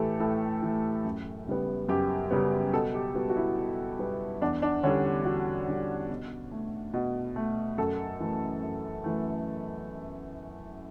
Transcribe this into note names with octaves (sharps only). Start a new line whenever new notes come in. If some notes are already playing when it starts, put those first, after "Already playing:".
Already playing: A2 E3 A3 G4 A4
A2 A4
E3 A3
F#2
C#3 G3 B3
F#2 G4
C#3 G3 B3
B2 A4
G4
G3 B3 F#4
F#4
E4
B2
G3 B3
E2 D4
D4
D3 G3 C#4
E2 F#4
D3 G3
B2
A3
B2
A3
F#2 A4
E3 A3
F#2
E3 A3